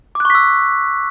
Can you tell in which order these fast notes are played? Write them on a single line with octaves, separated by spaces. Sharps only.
D6 F#6 C#6 B6 E6